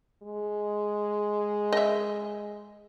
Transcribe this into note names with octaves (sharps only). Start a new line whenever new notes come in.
G#3
D#5 E5